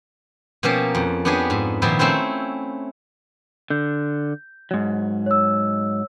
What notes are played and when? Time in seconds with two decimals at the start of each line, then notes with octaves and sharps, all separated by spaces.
0.63 B2 F3 A#3 C#4 G4 A#4
0.95 F2
1.25 B3 D4 G4 G#4 C#5
1.50 G#2
1.82 A#2 D#3 F3 B3 E4 G5
1.99 A3 C4 C#4 E4 C5
3.70 D3 G6
4.71 G#2 F#3
5.26 C#5 E6